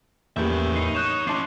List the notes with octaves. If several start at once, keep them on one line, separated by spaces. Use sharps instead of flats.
E2 A2 G3 A#3 C#4 E5 G6
D#4 C7
C#5 F#6 G6 E7
C#4 E4 A5 C6 D6 C7